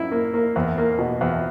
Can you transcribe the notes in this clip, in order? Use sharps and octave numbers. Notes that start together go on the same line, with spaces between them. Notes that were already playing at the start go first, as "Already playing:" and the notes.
Already playing: F#2 E4
A#3
A#3
E2
A#3
B2
E2